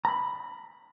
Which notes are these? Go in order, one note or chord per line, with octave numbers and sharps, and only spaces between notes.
A#5 B5